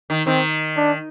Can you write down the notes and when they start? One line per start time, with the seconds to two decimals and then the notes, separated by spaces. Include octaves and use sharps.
0.10 D#3
0.26 D#3 C4
0.77 D4